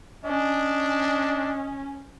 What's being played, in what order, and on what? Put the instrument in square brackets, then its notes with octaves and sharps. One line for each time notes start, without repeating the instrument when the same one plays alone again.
[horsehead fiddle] C#4 [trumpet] D4 [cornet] D#5